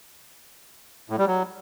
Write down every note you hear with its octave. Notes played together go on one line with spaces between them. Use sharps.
A2
G3
F#3